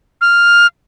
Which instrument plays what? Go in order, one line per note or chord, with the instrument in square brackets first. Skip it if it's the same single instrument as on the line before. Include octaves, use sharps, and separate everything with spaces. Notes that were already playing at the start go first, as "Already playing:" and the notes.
[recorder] F6